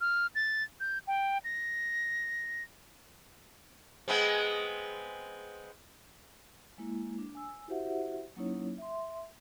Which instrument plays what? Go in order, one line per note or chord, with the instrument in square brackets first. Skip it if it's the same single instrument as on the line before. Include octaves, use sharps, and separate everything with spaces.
[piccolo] F6
A6
G6
G5
A#6
[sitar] G#3 B3 C4
[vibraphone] G#3 A#3 E4
D4
G#5 E6
E4 F#4 G4 C5 E5 F#5
F#3 A#3 C#4 D#4 E4 C#5
E5 C6